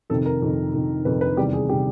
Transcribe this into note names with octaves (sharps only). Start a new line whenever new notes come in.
F2 C3 D#3 A4
A#4
F2 C3 D#3
F2 C3 D#3
F2 C3 D#3 B4
B4
E2 C3 D#3 G3 G4
G#4
C3 D#3 G3 G4